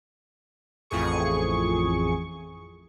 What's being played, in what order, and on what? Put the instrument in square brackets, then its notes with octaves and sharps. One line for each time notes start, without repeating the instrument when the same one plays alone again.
[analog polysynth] A1 F2 A2 G#4 C#6